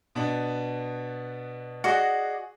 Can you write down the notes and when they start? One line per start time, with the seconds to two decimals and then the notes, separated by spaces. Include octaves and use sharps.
0.15 B2 B3 D4
1.84 F#4 G#4 D5 D#5 F#5